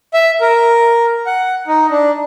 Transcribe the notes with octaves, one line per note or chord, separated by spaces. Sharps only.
E5
A#4
F#5
D#4
D4